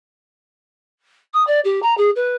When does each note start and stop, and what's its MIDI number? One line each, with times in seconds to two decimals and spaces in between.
1.33 1.45 87
1.47 1.59 74
1.64 1.80 67
1.82 1.96 82
1.97 2.10 68
2.15 2.36 71